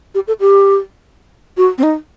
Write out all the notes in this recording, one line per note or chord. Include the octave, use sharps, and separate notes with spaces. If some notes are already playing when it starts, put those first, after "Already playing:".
G4
A4
G4
F#4
C4
D#4